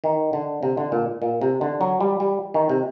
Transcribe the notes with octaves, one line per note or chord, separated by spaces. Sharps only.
D#3
D3
C3
D3
A#2
A#2
C3
D3
F#3
G3
G3
D#3
C3